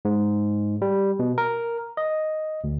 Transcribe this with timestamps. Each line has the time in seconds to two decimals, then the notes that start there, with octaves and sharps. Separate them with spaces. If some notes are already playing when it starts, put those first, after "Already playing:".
0.05 G#2
0.82 G3
1.19 B2
1.38 A#4
1.97 D#5
2.64 D2